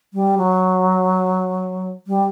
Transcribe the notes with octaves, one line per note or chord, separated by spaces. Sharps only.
G3
F#3
G3